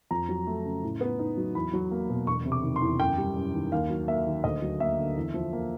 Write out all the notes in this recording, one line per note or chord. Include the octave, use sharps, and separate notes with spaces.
F2 A#5
F#3
A3
C#3
A2
B3
D#4
F#3
E2 B5
F#3
A#3
B2
E1 C#6
C3
D6
D#3
C6
E2
F#2 G5
G3
F#2
D#3
D#2 F5
F#3
A#3 E5
D#3
D2 D#5
F#3
A#3 E5
D3
E2
F3
A#3